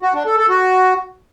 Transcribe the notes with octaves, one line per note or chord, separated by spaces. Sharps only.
F#4
D4
A4
A4
F#4